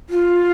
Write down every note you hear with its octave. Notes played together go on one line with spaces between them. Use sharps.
F4